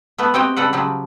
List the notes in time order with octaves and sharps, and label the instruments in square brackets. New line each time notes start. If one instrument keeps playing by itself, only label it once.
[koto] A3 B3 B4
C4 F#4 G4 C#5 D#5 G5
C#3 G3 A4 B4 F#5
C#3 F3 F#3 G4